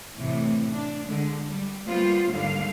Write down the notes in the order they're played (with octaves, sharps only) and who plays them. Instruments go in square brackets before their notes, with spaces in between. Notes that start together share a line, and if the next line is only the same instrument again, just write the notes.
[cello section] A2 C3 E3
D4
D3 G#3
G3
G3 A#3 B3 F4 C5
D#2 G#2 D3 G3 F5